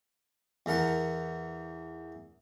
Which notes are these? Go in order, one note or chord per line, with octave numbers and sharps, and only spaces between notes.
E2 E3 A#4 F#5 A5